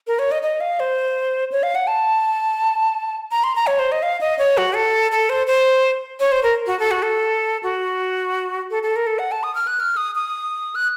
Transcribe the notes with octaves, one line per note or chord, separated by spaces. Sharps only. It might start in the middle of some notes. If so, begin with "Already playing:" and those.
A#4
C#5
D#5
D#5
F5
C5
C#5
F5
F#5
A5
A#5
C6
A#5
C#5
C5
D#5
F5
D#5
C#5
F#4
A4
A4
C5
C5
C#5
C5
A#4
F#4
A4
F#4
A4
F#4
A4
A4
A#4
A4
F#5
A5
D#6
F6
F#6
F6
D#6
D#6
F#6